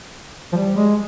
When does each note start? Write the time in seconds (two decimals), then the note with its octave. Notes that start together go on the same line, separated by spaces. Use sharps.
0.53 F3
0.57 G3
0.77 G#3